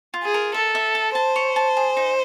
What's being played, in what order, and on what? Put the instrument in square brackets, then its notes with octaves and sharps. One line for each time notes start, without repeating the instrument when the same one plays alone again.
[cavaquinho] F4
[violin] G#4
[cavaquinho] A#4
[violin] A4 [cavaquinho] E5
[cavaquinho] E5
A5
[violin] C5 [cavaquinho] A5
[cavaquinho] C#5
A5
G#4
D#4